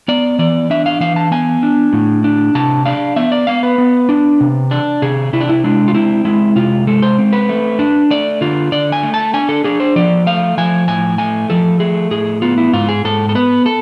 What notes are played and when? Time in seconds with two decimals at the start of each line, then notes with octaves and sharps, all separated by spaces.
0.08 B3 D5
0.39 E3 D5
0.70 D4 E5
0.86 F5
1.00 E3 F5
1.16 A5
1.31 B3 G#5
1.63 D4
1.93 A2
2.24 D4
2.55 C3 A5
2.86 D4 F5
3.16 B3 E5
3.32 D5
3.47 B3 F5
3.63 B4
3.78 B3
4.09 D4
4.41 C3
4.71 D4
5.02 C3 G#4
5.33 C3 E4
5.41 D4
5.49 E4
5.64 G#3 D4
5.88 F4
5.95 C4 E4
6.25 G#3 E4
6.56 C3 F4
6.87 G#3 A4
7.02 C5
7.18 C4
7.33 B4
7.49 A3
7.79 D4
8.11 A3 D5
8.41 D3 F4
8.72 D3 D5
8.92 G#5
9.03 A3
9.14 A5
9.34 D4 G#5
9.49 A4
9.64 D4 G#4
9.80 C5
9.96 F3 D5
10.27 A3 F5
10.58 F3 G#5
10.88 A2 G#5
11.18 A3 G#5
11.50 F3 A4
11.80 A3 G#4
12.11 A2 G#4
12.42 B3 F4
12.58 E4
12.73 G#2 F4
12.89 G#4
13.05 G#2 A4
13.29 A4
13.35 B3 B4
13.66 A4